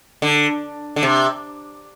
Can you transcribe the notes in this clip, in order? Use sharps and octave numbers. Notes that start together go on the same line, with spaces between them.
D3
D3
C3